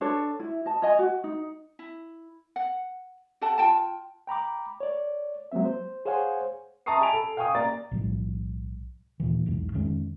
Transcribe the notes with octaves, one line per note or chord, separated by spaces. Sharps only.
D4 A4 C#5
E4
D#5 A5
C#5 D#5 G#5
F#4
D#4
E4
F#5
G4 A4 F#5 A5
F4 G5 A5
G5 A#5 B5 D6
C#5 D5
F#3 G#3 A#3 C4 E5
C5
G#4 C5 C#5 F5 F#5 G#5
E5 A5 A#5 C#6 D#6 C7
G#5 A5 B5 D7 F7
A4
F5 G5 G#5 C#6 D#6
A#3 D5 A#5 A6
B1 A2 F3 G3
D#2 A#2 E3
B1 E2 G#2
F2 D#3 G#3 C#4